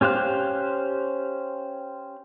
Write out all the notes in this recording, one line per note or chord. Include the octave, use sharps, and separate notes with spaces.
C#4 G4 C5 F5 F#6